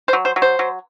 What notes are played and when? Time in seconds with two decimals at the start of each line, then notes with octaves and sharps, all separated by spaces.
0.08 C5
0.13 F#3
0.25 C5
0.36 F#3
0.42 C5
0.59 F#3